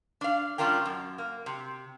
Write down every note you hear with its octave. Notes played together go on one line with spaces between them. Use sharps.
D4 F5
G3 C#4 D4 F4 A#4 G5
F#2
A#3
C3